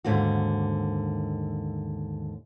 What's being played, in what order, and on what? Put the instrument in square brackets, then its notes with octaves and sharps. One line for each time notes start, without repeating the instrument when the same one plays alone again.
[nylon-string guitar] D#2 G#2 D3 A#3 F#4